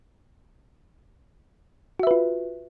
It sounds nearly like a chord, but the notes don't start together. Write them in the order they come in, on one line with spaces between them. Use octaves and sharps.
F#4 E5 B4 F4